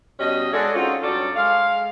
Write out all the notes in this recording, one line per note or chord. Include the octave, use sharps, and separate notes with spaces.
B2 G3 C#4 D#5
G#3 D4 F#4 G#4 A4
C4 C#4 D#4 F4 F#4
G2 F#3 C#4 A4 D5
G#3 F5